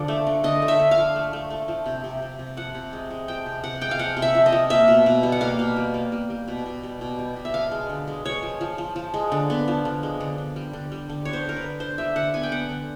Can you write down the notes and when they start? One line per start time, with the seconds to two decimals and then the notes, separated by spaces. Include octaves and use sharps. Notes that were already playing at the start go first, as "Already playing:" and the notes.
Already playing: D3 F3 D5
0.08 A3
0.27 D3
0.44 D3 D#5
0.62 A3
0.68 E5
0.79 D3
0.91 F5
0.97 F3
1.16 A3
1.33 A3
1.50 A3
1.68 F3
1.86 C3
2.04 C3
2.22 C3
2.39 C3
2.57 F3 F#5
2.75 C3
2.93 G#3
3.11 G#3
3.28 F3 G5
3.46 C3
3.64 C3 F#5
3.81 G#3 G5
3.91 F5
3.99 F3 F#5
4.17 C3
4.22 E5
4.35 F3
4.46 D#5
4.52 F3
4.70 A#3 E5
4.88 B2
5.06 B2
5.23 G3
5.32 F#5
5.41 A#3 F5
5.59 B2
5.76 G3
5.94 A#3
6.12 G3
6.30 G3
6.48 B2
6.66 B2
6.83 G3
7.01 B2
7.19 G3
7.36 B2
7.45 E5
7.54 F3 F5
7.72 G#3
7.90 D3
8.08 G#3
8.25 G#3 C#5
8.43 F3
8.61 F3
8.78 F3
8.96 F3
9.14 G#3
9.32 D3
9.50 B3
9.68 F3
9.85 D3
10.03 G#3
10.20 D3
10.38 D3
10.56 G3
10.73 D3
10.92 G3
11.10 D3
11.25 B3 C#5
11.33 C5
11.44 D3 A#4
11.57 B4
11.62 D3
11.80 D3 C5
11.98 G3 E5
12.16 D3 F#5
12.34 B3 G#5
12.43 G5
12.52 B3 F#5
12.69 D3